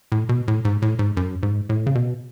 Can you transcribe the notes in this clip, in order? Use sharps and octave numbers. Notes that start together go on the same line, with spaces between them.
A2
B2
A2
G#2
A2
G#2
F#2
G#2
A2
C#3
B2